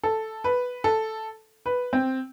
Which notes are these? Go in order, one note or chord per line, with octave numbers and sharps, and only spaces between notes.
A4
B4
A4
B4
C4